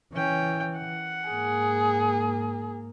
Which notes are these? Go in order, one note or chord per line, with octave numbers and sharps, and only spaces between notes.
E3 C#4 G5
F#5
G#2 A#3 G#4